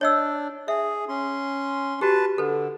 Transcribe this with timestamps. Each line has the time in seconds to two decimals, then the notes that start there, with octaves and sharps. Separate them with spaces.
0.01 D4 C#5 D#5 E6
0.68 G#4 E5
1.09 C#4 C6
2.01 F#4 G4 B4 A5
2.38 D3 A4 B4